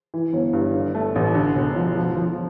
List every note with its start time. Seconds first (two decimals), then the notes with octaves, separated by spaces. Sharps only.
0.14 E3
0.33 G1
0.53 G2
0.74 D3
0.95 A3
1.16 A1
1.35 D3
1.55 E1
1.76 F3
1.97 F3
2.17 F3